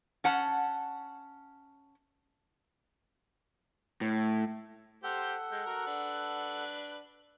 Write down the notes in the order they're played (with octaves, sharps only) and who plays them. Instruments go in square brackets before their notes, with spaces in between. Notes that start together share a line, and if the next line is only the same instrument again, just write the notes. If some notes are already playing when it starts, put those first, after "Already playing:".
[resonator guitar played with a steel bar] C#4 F#5 A5
[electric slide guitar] A2
[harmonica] G4 C5 G5 [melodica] A4 F#5
[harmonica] G#3 G5
F#4 A#4
D4 B4